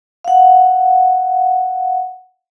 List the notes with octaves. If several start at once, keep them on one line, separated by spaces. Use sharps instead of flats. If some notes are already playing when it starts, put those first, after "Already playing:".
F5 F#5